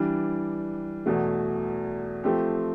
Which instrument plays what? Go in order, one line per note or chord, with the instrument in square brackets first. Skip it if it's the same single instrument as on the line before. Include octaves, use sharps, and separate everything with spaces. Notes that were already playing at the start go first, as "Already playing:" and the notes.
Already playing: [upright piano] E3 G3 D4
E2 B2 A3
F3 A3 C4 G4